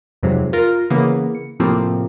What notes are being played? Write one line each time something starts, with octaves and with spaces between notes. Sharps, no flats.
F2 G#2 C3 F#3
F4 A#4
C#3 E3 A#3 B3
C#7
A2 C3 F3 A#3 C4